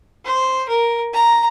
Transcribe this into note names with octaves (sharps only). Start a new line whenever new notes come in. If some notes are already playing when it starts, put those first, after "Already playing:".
C5
A#4
A#5